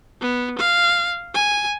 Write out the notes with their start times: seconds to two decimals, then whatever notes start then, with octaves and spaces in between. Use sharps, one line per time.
0.21 B3
0.59 F5
1.34 G#5